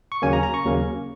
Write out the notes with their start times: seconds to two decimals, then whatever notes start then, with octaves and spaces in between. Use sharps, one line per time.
0.12 C#6
0.22 D#2 C#3 F#3 A#3 C#4 G#5
0.33 A#5
0.43 A#5
0.54 C#6
0.65 D#2 C#3 F#3 A#3 C#4